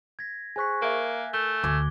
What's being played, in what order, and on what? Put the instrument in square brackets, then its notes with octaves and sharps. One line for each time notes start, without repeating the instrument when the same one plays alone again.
[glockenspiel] G#6 A#6 B6
[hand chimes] G#4 C5 C#6 [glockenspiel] G#5 F#6 B6
[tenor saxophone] A#3 [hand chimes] A#4 E5 [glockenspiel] G#6
[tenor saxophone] A3 [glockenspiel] G7
[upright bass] D2 [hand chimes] G#5 D6 G#6